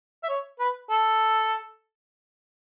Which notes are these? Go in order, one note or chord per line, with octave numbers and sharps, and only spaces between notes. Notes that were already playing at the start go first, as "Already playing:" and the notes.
E5
C#5
B4
A4